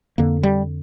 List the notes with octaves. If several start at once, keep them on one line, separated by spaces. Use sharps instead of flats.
F2 D3 A#3
G3